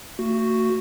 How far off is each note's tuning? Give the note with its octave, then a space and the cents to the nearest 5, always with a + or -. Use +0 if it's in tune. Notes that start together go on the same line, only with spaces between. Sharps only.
A3 +40 F#4 +0